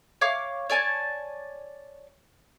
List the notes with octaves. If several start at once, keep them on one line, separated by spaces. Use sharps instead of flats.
C#5 F5 D6
C#5 D5 G#5 A5